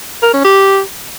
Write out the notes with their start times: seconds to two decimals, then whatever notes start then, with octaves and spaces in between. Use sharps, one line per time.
0.23 A#4
0.34 C#4
0.44 G4